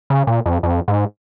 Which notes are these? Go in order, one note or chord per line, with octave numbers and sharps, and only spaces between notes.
C#3
A#2
F2
F2
G#2